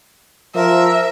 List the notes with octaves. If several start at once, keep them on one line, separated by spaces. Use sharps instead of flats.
F3 A#4 E5